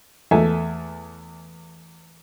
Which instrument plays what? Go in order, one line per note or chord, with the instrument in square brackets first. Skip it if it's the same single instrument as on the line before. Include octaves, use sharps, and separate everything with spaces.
[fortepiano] E2 A3 A4 E5 G#5